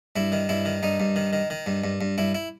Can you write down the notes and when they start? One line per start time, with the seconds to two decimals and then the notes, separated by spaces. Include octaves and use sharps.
0.16 G2 E4
0.32 D#3
0.49 G2 E4
0.65 D#3
0.83 G2 D#4
1.00 G2
1.16 D#3
1.33 D#3
1.50 D#3
1.66 G2
1.84 G2
2.01 G2
2.18 G2 E4
2.35 E4